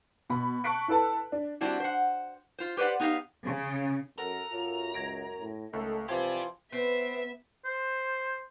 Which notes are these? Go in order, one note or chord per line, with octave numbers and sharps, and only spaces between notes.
B2 B5
A5 C#6 F#6 B6 D7
E4 A4 B4 A5
D4
G3 C4 D4 E4 F#4
C5 F#5
F4 C5
G4 B4 C5 D5 F#5
B3 D#4 G4 D5 F5
C#3
F#2 A4 A#4 F#5 A#5
F#2 F4
C#2 G#6 A#6 D7
A2
C#2 D#3 A3 C#4 A4 D#5 C#6
C3 E3 F3 G4 D5 G5 C6 G#6
B3 C4 B4 E5
C5